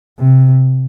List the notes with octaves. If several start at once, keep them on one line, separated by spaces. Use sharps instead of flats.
C3